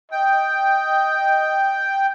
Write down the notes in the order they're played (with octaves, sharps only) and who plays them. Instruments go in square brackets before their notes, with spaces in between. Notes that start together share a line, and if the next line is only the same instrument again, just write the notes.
[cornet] D#5 [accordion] G5